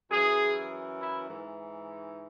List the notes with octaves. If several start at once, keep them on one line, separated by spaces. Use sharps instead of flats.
F#2 E3 G#4
E4
G#2 E3